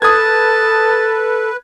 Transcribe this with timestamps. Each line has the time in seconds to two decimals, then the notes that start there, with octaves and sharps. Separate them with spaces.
0.02 A4 B4 A5 D#6 G#6